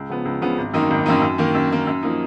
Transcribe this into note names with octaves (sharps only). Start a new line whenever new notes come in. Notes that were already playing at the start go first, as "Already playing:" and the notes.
Already playing: C#2
C#3 F3 B3
C#2
C#3 F3 B3
G#1
F#2 D#3 A#3 D#4
G#1
F#2 D#3 A#3 D#4
F#2
D#3 A#3
F#2
D#3 A#3
F#2
F3 A#3 D#4